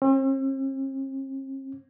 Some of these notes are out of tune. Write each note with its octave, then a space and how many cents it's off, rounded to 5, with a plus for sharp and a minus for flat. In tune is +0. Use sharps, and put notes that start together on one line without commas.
C4 +45